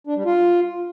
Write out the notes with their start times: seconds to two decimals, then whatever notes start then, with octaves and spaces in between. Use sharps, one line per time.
0.07 D4
0.16 G3
0.26 F4